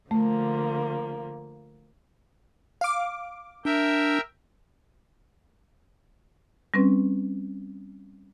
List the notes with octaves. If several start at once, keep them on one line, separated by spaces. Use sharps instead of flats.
D3 F3 A3 A#3
F5 D6
D4 A#4 E5 G5
G3 C4 C#4 B4